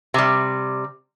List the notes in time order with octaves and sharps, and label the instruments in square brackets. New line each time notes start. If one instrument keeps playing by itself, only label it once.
[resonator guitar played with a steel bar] C3 G3